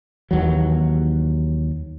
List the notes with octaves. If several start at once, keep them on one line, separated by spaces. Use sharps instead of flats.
D#2 E3 F#3